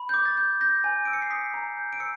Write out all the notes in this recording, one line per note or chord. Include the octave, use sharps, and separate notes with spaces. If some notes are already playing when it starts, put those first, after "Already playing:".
Already playing: B5
G6
D6
A6
G6
G6 A#6
G#5
E6 D7
C#7
C7
D#6 B6
A#5
G6
D7
E6 C#7